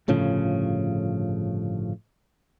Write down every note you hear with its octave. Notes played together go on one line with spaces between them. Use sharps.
G1 A2 C#3 F3